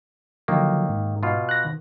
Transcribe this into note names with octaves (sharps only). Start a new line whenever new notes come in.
D3 D#3 F3 F#3 A#3
G#2
B2 F4
F#6 A#6
D#3